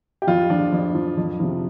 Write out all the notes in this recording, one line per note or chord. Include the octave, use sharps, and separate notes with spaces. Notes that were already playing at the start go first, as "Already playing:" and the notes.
G4
F2 F4
F3 D4
F2
F3
F2
C3 F3